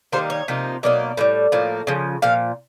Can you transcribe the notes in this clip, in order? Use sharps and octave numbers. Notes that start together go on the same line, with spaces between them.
D#3 G3 A#3 D#4 C5
C#5
C3 F3 A#3 D#4
B2 F#3 A#3 D#4 D5
A2 E3 G3
A2 F3 A#3
C#3 F3
A#2 F3 F5